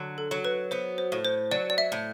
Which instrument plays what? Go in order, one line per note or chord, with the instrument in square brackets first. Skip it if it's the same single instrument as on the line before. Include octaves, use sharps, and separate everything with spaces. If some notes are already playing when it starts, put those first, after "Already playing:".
Already playing: [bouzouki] D3 F#3
[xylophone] A4
[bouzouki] F#3
[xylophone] B4
[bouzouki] B3 [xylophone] C5
[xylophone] C5
[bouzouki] A2
[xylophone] C5
[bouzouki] F#3 [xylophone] D5
[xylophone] D5
E5
[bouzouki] A2